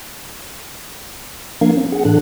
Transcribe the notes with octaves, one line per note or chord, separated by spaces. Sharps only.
F3 A#3 D4 A#4 F5 G#6
C4 C#4
G#4 F#5
A2 E3 D4 A4 F#6